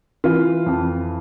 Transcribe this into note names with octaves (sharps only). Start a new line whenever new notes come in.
E3 F4
F2